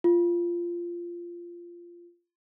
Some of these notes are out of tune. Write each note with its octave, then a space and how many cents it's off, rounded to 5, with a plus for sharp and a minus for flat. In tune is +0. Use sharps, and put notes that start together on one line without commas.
F4 -15